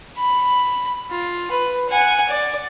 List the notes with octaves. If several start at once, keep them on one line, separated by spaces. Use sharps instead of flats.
B5
F4
B4
F#5 G#5
D5